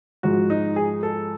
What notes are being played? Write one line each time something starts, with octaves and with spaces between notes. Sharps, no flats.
G#2 F3 G#3 F#4
D#4
G#4
A4